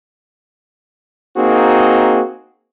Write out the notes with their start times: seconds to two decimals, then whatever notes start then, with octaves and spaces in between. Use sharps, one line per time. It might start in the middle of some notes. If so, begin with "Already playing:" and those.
1.37 A#3 C4 D#4 F#4 G#4